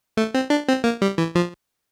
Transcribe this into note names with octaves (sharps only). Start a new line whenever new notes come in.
A3
C4
D4
C4
A#3
G3
E3
F3